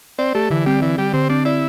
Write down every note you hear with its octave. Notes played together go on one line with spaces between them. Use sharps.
C4 D5
A3 G4
D3 E3
G3 C4
E3 D5
G3 G4
D3 C4
C4 D4
E4 D5